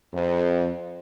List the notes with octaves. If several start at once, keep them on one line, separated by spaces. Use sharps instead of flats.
F2